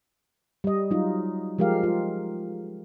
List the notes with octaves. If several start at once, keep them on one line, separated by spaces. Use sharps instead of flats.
G3 D#5
F#3 G3 D#4 F4
F3 G#3 G4 A#4 F5
F4